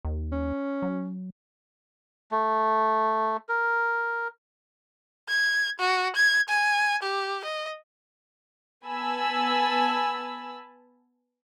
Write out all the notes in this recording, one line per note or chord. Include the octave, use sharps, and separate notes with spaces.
D#2
C#4
F#3
A3
A#4
G#6
F#4
G#6
G#5
G4
D#5
B3 G#5 A5 B5 E6